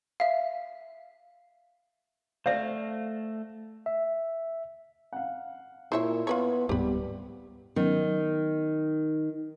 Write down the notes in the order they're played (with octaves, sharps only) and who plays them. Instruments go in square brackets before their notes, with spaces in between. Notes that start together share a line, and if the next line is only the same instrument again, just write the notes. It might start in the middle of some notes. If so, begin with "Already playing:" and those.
[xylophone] E5 F5
[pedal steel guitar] A3 [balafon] C5 D5 [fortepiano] F5
[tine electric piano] E5
[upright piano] F5 F#5
[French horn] A#2 [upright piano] E4 [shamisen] C5 C#5 E5
[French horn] B3 [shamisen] F4 B4 C#5
[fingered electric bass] D1 G#2 B3 [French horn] G3 [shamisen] G4 B4
[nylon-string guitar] D#3 [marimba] F#3 B3 C#4